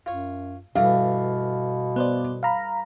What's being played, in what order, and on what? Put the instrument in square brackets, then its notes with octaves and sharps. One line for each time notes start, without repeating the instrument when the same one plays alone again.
[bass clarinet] F#2 [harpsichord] F4 C#5
[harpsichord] G2 E3 A3 [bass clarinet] B2 [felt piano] F5
[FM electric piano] B3 C5 D5
F5 A#5 B5